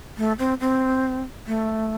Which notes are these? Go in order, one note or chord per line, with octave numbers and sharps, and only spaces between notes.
A3
C4
C4
A3